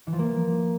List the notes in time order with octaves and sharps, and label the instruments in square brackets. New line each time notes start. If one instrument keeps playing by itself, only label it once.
[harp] E3
F3
A#3